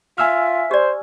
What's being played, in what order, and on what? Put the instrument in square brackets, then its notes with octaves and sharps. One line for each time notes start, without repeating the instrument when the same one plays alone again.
[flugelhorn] F4 [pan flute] E5 [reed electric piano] G#5 E6 F6
[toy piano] G4 D5 [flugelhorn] C5